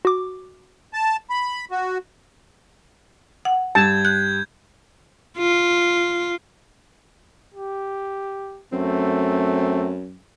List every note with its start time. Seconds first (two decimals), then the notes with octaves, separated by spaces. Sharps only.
0.05 F#4 D6
0.94 A5
1.30 B5
1.71 F#4
3.45 F#5
3.75 G2 A5 G6 G#6
4.05 F#6 G6
5.38 F4
7.54 G4
8.72 F#2 A3 C4